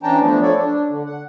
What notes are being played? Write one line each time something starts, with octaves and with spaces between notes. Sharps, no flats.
E3 C#4 D4 G5 A5 A#5
F3 A3 B3 D4
A4 C#5 D5
D4
D3
F#5